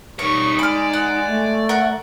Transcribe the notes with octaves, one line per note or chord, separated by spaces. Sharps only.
G3 D#4 A#4 C#5 C#6
G#3 D5 B5 F6
F#5
A3
A#4 F#5